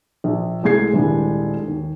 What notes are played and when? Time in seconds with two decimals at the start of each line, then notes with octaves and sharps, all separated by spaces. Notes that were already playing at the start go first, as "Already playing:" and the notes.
0.24 A#1
0.63 C2 G#3 A3 G#4 G#6 C7
0.93 D#1 C2 G3 G#3 D4
1.68 D#2